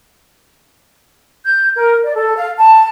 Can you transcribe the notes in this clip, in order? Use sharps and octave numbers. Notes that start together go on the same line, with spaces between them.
G6
A#4
D5
A4
F5
A5